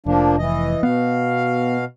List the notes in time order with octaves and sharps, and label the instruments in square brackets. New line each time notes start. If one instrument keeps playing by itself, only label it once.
[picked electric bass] F1 [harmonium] F3 A#3 D4
[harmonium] E3 D#5
[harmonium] B2 F5 [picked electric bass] B3